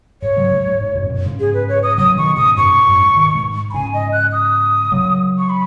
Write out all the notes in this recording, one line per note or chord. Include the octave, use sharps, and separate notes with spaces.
G#2 C#5
C#3 F#3
G#2
G#2
G#2
F#2 B2
F#2 B2
G#2 C#3
G#4
B4
C#5
D#6
C#3 F#3 D#6
B2 D#3 C#6
G#2 C#3 D#6
F#2 B2 C#6
G#2
F#2
G#2
B2 D#3
G#2
B5
G#2 C#3 G#5
D#5
F#6
D#6
C#3 F#3
C#6
B5